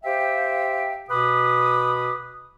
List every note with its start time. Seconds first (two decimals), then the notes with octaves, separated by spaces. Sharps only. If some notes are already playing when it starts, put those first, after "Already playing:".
0.04 G4 C5 E5 F5 G5
1.09 B2 B4 B5 D6 D#6